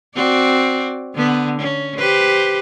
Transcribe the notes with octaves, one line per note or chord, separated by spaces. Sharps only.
C4 F#4 D5
D3 B3
C#4
G4 B4 C5